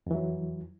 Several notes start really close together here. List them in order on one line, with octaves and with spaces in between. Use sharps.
F2 E3 F#3